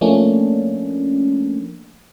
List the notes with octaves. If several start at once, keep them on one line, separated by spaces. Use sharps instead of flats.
F3 A3 A#3 C#4 D4